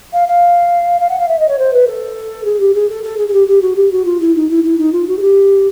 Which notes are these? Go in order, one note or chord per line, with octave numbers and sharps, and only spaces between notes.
F5
F5
F5
F#5
F5
E5
D#5
C#5
C5
B4
A4
G#4
G4
G#4
A4
A4
G#4
G#4
G4
G4
F#4
G4
F#4
F4
E4
D#4
E4
E4
D#4
F4
F#4
G#4
G4